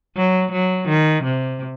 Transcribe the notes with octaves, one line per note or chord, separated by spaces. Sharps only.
F#3
F#3
D#3
C3